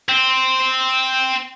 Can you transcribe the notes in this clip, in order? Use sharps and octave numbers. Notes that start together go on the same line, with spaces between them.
C4